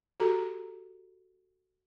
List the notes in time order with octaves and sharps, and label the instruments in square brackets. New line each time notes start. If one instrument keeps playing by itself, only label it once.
[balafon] F#4 G4 A4 A#5